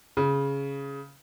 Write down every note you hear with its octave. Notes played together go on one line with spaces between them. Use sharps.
C#3